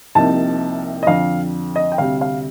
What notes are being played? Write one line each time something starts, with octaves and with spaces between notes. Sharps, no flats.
C2 C3 F3 A#3 D#4 A5
D#5
F2 D3 F3 F5
D#5
G5
D2 C3 G3 F5
F5